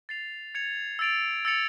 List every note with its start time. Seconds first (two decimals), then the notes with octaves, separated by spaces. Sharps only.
0.09 A6 C7 F7
0.55 G#6 C#7 F7
0.99 E6 A6 D7 F7
1.45 E6 A6 C#7 F7